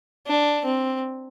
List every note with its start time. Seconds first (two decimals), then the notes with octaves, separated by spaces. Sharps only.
0.27 D4
0.65 C4